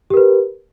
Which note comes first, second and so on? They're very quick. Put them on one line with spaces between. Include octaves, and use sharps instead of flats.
G4 A#4 B4